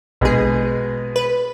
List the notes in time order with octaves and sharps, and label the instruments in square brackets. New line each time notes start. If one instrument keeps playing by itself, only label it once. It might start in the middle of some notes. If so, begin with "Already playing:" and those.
[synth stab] A#1 G#4 [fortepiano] B2 G#3
[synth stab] B4